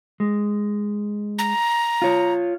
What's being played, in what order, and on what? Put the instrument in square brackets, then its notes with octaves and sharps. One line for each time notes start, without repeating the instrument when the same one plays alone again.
[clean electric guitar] G#3
[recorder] A#5
[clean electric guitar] F4 C#5